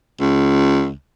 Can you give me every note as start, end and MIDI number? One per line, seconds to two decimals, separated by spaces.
0.20 0.91 37